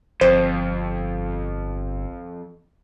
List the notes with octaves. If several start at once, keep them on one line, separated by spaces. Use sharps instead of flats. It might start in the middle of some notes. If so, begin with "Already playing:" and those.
G1 F2 C5